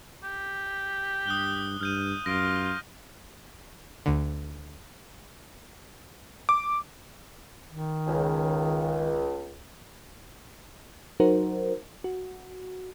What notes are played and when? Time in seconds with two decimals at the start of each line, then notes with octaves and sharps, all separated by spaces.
0.23 G4
1.26 G2 D#6 F#6 G7
1.81 G2 F6 G6 D#7
2.26 F#2 F4 A#6 D7
4.06 D2 D3
6.49 D6
7.71 D#3
8.07 C#2
11.20 F#3 D#4 F#4 A#4 C5
12.04 F#4